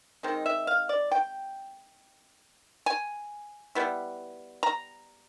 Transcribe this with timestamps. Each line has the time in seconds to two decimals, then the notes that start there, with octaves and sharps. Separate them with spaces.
0.23 D#3 G#3 C4 D#4
0.46 E5
0.67 F5
0.89 D5
1.11 G5
2.86 G#5
3.75 G3 B3 E4
4.63 A#5